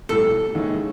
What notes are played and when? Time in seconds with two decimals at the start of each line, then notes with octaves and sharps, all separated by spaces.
0.09 B1 A2 E3 G3 A4
0.55 D#2 D#3 G#3 C#4 E4